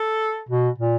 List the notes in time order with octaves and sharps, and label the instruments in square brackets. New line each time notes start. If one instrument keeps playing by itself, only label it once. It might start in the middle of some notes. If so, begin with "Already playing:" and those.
Already playing: [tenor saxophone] A4
[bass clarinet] B2
A#2